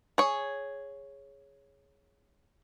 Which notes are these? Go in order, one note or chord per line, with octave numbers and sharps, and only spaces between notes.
G#4 C#5